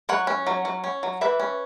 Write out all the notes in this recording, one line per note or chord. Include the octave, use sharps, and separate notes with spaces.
F#3 C#5 F#5
C#4
F#3
F#3
C#4
F#3
E3 B4 E5
C#4